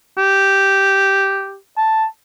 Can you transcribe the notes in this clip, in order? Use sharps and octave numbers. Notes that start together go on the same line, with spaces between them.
G4
A5